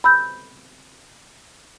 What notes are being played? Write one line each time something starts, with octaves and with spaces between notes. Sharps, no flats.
B5 E6 G6